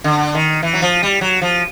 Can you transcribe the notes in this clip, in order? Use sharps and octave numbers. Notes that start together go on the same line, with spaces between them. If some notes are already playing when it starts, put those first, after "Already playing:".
D3
D#3
E3
F#3
F3
G3
F#3
F3